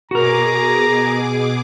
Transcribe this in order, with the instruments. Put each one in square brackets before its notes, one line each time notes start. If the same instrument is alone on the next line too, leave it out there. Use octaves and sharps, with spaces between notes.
[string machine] B2 G#4 D6 [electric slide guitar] F#4 A#4 [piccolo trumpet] A#5